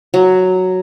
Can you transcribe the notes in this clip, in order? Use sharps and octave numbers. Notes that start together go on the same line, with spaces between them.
F#3